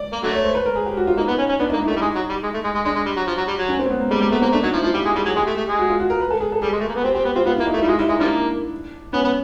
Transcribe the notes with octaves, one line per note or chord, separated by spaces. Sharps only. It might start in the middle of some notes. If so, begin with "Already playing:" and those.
Already playing: D5
A#3
D3 F#3 A3
C#5
C5
B4
A#4
G#4
G4
F#4
F4
A#3 D#4
B3
C#4
C#4
B3 D4
D#4
A#3
E4
A3
D#4
G3
G#3
F#3
G3
G#3
A3
G#3
G#3
G#3 D4
G#3
G3
F#3
F3
F#3
G3
F#3
C#4
C4
B3
A#3
G3 G#3
G3 A#3
A3 B3
A#3 C4
A3 D4
F#3 D#4
F3 E4
F3 F4
G3 G4
G#3
G3 G#4
F#3 G#4
G#3 G4
A3
A3
G#3
F#4
F4
F#4
A#4
B4
A4
G#4
A4
G3 G#4
G#3
A3
A#3
B3
C4 G4
C4 G4
B3
C4 F4
B3 F4
E4
A#3
D#4
A3
E4
G3
G#3 F4
G3 E4
G#3 D#4
F3 G3 A#3 D4
B3 C#4
B3